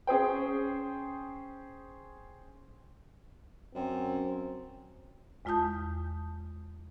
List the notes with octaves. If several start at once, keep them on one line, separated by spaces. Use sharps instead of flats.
C#4 G#4 C5 G5
F#2 C4
E2 G#3 F4 A5 D#6 G6